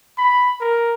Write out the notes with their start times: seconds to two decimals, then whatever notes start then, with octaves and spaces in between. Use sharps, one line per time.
0.18 B5
0.60 A#4